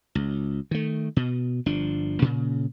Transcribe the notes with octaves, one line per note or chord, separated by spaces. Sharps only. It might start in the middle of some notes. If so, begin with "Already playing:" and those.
C#2
D#3 A3
B2
G1 F3 D4
A#2 C#3